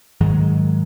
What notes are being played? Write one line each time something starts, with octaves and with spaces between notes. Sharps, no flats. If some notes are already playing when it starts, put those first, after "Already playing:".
G#2 D#3 F#3 G#3